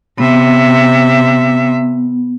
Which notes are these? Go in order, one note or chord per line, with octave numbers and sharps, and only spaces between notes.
C3 B3 E5